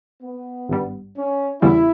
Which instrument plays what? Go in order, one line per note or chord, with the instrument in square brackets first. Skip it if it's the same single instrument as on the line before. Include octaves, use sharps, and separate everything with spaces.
[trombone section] B3
[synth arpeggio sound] G#1 G2 G3
[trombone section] C#4
[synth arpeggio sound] E2 C#3 E3 G3 C#4 [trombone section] E4